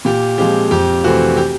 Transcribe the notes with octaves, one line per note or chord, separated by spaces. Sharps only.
A#2 G4
F3 G#3 C4 G4
F2 G4
C3 E3 A3 C4 F#4
G4